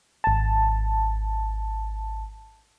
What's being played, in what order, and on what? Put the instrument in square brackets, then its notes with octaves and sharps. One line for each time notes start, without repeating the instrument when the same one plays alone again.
[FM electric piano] G#1 A5